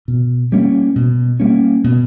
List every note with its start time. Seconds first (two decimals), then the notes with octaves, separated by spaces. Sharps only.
0.08 B2
0.52 G3 A#3 C#4
0.96 B2
1.40 G3 A#3 C#4
1.84 B2